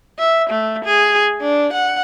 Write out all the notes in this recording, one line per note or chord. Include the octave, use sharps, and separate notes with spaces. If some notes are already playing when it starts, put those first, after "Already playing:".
E5
A3
G#4
D4
F#5